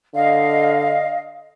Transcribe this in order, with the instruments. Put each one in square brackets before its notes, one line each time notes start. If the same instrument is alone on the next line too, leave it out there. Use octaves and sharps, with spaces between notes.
[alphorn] D3 [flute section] D#5 F5